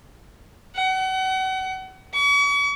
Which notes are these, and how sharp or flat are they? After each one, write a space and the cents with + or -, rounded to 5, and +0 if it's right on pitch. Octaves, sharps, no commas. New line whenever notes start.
F#5 +35
C#6 +40